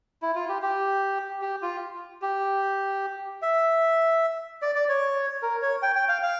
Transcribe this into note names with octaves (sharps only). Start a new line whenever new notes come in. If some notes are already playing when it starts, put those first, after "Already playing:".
E4
F4
G4
G4
G4
F4
G4
E5
D5
D5
C#5
A#4
C#5
G5
G5
F5
F5